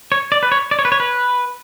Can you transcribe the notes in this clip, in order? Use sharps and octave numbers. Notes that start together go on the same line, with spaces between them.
C#5
D5
B4
C#5
D5
C#5
B4
C#5
B4